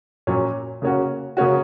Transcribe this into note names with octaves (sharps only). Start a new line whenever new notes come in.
A#2 F#3 C#4
C#3 A#3 C#4 F#4
C#3 A#3 C#4 F#4